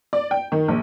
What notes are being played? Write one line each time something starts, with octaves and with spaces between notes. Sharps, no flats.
D5
G5
D#3
A#1